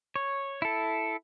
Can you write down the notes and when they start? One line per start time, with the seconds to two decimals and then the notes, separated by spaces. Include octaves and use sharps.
0.16 C#5
0.62 E4 A4